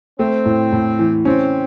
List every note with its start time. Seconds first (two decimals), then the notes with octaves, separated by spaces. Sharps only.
0.19 A3 C4
0.45 A2
0.72 A2
0.99 E3
1.25 C4 C#4